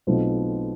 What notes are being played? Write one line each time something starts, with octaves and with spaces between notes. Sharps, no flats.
B1 B2 A3 C4 F4